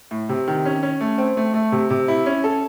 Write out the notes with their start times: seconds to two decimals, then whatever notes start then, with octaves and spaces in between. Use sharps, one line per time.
0.11 A2
0.29 C3
0.48 D#3
0.65 C#4
0.83 C#4
1.01 A3
1.18 C4
1.37 A3
1.54 A3
1.72 C3
1.90 C3
2.08 E4
2.26 C#4
2.44 A4